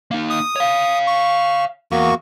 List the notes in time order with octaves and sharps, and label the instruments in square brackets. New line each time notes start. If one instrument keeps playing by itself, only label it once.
[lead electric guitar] A#3 D#4
[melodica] D#6
[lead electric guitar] C#5 F5
[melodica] C#6
[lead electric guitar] E2 [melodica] A#3 F#4 C#6